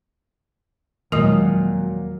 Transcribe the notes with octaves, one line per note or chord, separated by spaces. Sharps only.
D#2 A#2 F3 F#3 G#3 A#4